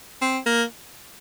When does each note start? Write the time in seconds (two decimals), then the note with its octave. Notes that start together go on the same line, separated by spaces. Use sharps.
0.22 C4
0.46 A#3